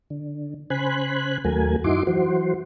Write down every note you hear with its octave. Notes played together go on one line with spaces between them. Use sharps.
D3
C#3 C5 G#5 B5 F#6
D#2 F#3 A3 A#4 G#5
F#2 D#4 E4 F#4 C6 D6
E3 F#3 F#4 C5